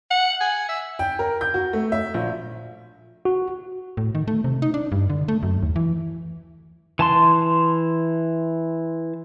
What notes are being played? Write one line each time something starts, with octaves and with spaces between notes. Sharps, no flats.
F#5
G#5
E5
G5
A#4
G6
F#4
A3
E5
A#1
F#4
A2
D#3
A3
C3
D#4
D4
G2
D3
A3
F#2
D#2
E3
E3 A5 C6